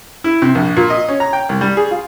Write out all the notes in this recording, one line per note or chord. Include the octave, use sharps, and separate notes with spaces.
E4
C3
A#1
A#2
D#5
C#4
A#5
G5
C2
G3
G#4
F4